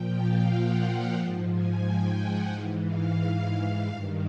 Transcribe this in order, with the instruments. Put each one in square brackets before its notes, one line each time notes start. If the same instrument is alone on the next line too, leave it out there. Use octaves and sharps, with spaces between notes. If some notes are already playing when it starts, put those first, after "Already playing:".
Already playing: [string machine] A#2 F3 G5
F5
F#5
G5
G#2 F3 A5
G#5
G5
F#5
G#2 E3 F5
F5
G2 D#3 F5